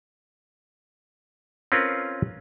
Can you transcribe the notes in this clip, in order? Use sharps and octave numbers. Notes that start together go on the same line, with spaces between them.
C4 C#4 F4 A#4 B4